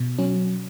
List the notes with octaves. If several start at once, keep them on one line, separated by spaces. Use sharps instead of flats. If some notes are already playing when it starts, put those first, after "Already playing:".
Already playing: B2
F#3 C#4